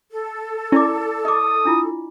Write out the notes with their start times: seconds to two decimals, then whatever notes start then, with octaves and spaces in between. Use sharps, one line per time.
0.11 A4
0.72 C#4 E4 D5 D6
1.25 D#5 D6 D#6
1.65 D4 E4 F4